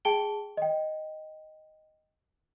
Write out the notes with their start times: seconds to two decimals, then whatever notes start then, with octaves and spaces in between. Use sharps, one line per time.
0.05 G#4 G5 A5 D7 G7
0.57 D#5 G5